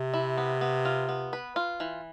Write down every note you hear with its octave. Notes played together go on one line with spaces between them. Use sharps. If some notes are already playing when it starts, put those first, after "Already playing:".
Already playing: C3
E4
B3
B3
F4
B3
B4
F4
E3